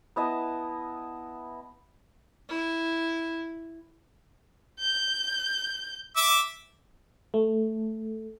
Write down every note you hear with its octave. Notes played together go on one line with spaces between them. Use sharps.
B3 E4 D#5 A5
E4
G6
E5 D6 E6
A3